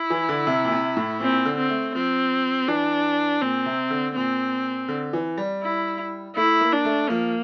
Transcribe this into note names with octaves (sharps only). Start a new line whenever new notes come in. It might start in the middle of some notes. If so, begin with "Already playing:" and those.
Already playing: E4
E3
D3
C3
A#2
C3
A2
A#2 C4
D3
C4
A3
F3 C4
E3 D4
A#2 C4
C3
D3
A#2 C4
D3
E3
G3
E4
A3 E4
A#3
D4
A3
F3 A#3